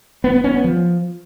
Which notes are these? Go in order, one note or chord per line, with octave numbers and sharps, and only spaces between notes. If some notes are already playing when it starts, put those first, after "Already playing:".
B3
B3
C#4
B3
F3